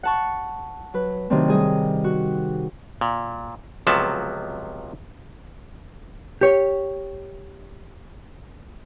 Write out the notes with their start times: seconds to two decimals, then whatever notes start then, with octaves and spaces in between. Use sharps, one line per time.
0.03 F#5 A5 C#6
0.93 F#3 B4
1.30 C3 D#3 F#3 A3 C4 D4
1.48 G3 G#4 D#5
2.04 F#4
3.01 A#2
3.87 C#2 C3 F3 F#3 B3 A5
6.41 G4 C#5